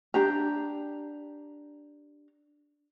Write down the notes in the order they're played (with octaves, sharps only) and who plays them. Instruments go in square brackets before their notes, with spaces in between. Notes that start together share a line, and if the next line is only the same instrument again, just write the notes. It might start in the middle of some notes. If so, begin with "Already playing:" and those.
[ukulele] D4 G4 A#5